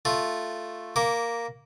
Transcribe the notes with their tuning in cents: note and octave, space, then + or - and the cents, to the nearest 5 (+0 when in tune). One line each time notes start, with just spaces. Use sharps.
A3 +0 F4 +0
A#3 +0 D6 -25